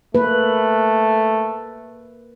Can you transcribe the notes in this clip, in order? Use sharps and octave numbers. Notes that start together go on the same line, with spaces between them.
A3 A#3 B4